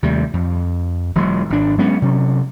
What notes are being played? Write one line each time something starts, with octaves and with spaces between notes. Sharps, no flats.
D#2 C3 G3 A3
F2
E1 E3 F#3 G#3
G#1 D4
F#3 G#3 B3 C#4
C3 F#3 C#4